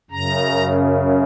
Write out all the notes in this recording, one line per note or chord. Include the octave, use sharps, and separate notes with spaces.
F#2 C#3 A#5